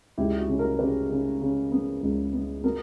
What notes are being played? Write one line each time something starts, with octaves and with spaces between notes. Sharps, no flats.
C#2 E4 G4
F#4
C#3
F#4 A#4
C#3 G4 B4
C#3
C#3
B3
C#2
B3
B3 F#4 A#4